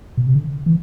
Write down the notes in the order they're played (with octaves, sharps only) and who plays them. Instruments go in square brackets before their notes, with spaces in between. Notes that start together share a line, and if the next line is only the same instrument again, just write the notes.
[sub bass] B2
C3
D3
E3